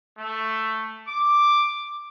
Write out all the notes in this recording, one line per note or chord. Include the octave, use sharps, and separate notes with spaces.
A3
D6